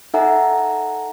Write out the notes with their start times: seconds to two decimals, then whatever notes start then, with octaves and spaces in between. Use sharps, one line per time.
0.14 D#4 A4 E5 F#5 G#5 A#5